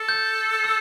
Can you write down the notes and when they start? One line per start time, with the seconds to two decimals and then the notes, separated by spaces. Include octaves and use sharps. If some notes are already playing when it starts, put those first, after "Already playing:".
Already playing: A4
0.09 G6
0.64 E6